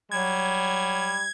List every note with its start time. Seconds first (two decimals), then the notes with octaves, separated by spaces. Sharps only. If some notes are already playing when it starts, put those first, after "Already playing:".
0.11 F#3 G3 G#6